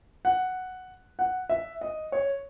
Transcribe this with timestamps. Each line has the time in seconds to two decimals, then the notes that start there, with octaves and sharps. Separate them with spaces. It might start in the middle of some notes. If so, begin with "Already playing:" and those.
0.25 F#5
1.19 F#5
1.49 E5
1.81 D#5
2.12 C#5